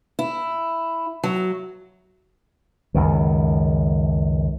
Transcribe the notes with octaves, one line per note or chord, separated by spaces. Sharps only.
E4
F#3
C#2 F#2 D#3